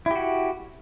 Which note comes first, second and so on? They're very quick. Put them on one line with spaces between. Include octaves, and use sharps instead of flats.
E4 G4 F#4